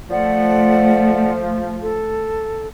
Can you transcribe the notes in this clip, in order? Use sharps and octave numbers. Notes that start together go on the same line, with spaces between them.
F3 A3 D5 F#5
A4